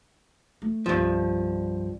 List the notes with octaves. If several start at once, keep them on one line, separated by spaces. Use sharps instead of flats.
A3
C2 G2 F3